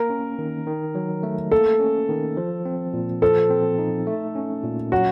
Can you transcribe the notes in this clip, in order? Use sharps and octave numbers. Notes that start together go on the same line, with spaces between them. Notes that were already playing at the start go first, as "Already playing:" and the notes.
Already playing: A#3 A#4
C#4
D#3
D#3
F#3
A3
A#3 A4
C#4
D#3
F3
C4
A#2
F3 A4
C4
D#4
A3
C#4
A#2
F#3 F#4